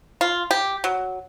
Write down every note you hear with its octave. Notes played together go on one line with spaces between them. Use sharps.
F4
G4
F#3